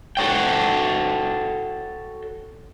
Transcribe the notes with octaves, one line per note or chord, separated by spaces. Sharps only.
F#4 A4 C#5 G5